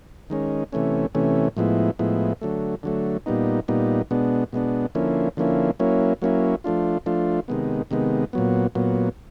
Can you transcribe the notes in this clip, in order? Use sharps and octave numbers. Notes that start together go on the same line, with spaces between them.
D#3 G#3 C#4
C3 E3 A3 C#4
C3 E3 A3 C#4
A2 F3 G#3 B3 E4
A2 F3 G#3 B3 E4
D3 F#3 A3
D3 F#3 A3
A#2 G3 B3 D#4
A#2 G3 B3 D#4
B2 G#3 B3 D4
B2 G#3 B3 D4
D3 F3 A#3 C#4 E4
D3 F3 A#3 C#4 E4
F#3 A#3 C#4 E4
F#3 A#3 C#4 E4
F3 A3 D4 F4
F3 A3 D4 F4
C3 D#3 G#3 B3
C3 D#3 G#3 B3
A#2 F#3 B3
A#2 F#3 B3